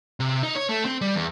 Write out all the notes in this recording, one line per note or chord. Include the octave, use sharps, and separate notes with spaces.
C3
D#4
C#5
A3
C4
G3
E2